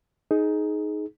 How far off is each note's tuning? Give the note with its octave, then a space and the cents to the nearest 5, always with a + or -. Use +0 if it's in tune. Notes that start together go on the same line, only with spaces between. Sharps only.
D#4 +5 G#4 +20